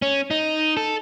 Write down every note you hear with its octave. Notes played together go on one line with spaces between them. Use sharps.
C#4
D#4
A4